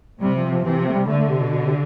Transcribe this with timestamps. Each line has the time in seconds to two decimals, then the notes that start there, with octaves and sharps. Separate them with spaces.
0.21 C3 G3
0.36 F3
0.51 F3
0.65 C3 E3
0.79 F3
0.88 A3
0.93 G3
1.07 D3 A3
1.18 A3
1.29 C3
1.40 B2
1.51 B2
1.66 C3